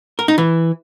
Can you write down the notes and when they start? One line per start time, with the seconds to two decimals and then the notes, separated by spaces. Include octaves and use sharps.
0.19 A#4
0.28 D#4
0.38 E3